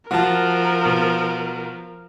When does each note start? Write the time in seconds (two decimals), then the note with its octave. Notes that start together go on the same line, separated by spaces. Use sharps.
0.11 F3 F#4 A#4 A5
0.85 B2